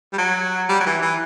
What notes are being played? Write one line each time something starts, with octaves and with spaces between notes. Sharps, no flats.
G3
F#3
G3
F#3
E3
E3